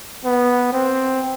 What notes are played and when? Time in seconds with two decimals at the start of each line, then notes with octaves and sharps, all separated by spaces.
0.25 B3
0.72 C4